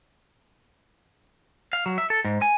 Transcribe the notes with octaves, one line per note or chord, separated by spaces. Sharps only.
F5
F#3
E5
A4
G#2
G#5